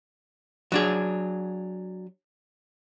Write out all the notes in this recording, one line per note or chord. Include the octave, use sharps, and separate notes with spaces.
F#3 D4 G#4